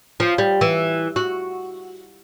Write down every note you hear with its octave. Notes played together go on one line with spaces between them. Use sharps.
F3
G3
E3
F#4